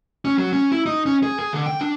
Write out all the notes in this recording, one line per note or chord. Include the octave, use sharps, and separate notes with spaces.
C#4
F#3
C#4
E4
D#4
C#4
G#4
G#4
D3
G5
D4